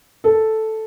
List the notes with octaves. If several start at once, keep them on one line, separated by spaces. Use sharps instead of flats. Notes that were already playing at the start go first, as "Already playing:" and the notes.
A4